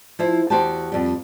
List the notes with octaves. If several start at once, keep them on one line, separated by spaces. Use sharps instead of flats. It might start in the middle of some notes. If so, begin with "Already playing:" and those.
F3 E4 C5
E2 F#4 G4 C5 G5 A5
F2 G3